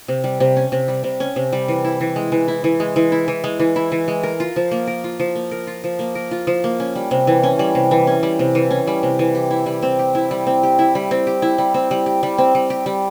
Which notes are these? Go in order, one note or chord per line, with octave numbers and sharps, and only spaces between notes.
C3
G3
C3
C#4
C3
G3
C3
C#4
C3
G3
E3
E4
E3
G#3
E3
E4
E3
G#3
E3
E4
E3
G#3
E3
E4
E3
G#3
A#4
F4
F3
A#3
A#4
F4
F3
A#3
A#4
F4
F3
A#3
A#4
F4
F3
A#3
C#4
G3
C3
E3
C#4
G3
C3
E3
C#4
G3
C3
E3
C#4
G3
C3
E3
G4
E4
G3
C4
G4
E4
G3
C4
G4
E4
G3
C4
G4
E4
G3
C4
G3
G4
G3
C4
G3
G4
G3